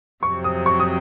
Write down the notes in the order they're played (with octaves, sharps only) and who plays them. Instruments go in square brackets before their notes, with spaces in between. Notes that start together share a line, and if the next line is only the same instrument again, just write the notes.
[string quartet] F2 C3 F#3 C4 [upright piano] C#6
[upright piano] D#6
C#6
D#6